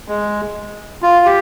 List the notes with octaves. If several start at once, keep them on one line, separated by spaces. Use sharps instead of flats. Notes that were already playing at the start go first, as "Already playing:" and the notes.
G#3
F4
G4